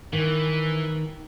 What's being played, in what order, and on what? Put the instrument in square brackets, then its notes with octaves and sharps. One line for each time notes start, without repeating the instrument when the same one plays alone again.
[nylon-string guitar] D#3 [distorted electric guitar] E3